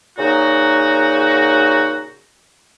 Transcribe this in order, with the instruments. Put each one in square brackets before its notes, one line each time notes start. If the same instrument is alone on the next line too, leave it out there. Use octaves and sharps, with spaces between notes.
[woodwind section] A#2 C#3 D#4 F#4